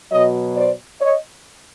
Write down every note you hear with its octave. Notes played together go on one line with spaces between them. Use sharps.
B2 F#3 C#5 D#5
C5 D5
C#5 D#5